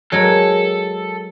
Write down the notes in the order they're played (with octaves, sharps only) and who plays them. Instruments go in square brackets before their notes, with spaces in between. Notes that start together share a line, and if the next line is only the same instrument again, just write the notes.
[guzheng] F#3 G#3 A#4 [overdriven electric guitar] A4